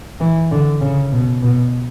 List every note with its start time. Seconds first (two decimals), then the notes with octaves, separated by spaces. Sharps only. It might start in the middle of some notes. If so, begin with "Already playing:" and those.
0.20 E3
0.51 D3
0.81 C#3
1.12 B2
1.42 B2